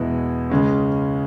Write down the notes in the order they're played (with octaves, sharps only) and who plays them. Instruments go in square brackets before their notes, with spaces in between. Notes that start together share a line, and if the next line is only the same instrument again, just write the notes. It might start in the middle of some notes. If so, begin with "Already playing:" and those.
Already playing: [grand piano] E2 B2 G#3 B3 E4
C#2 C#3 G#3 C#4